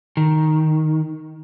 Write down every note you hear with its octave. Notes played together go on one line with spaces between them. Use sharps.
D#3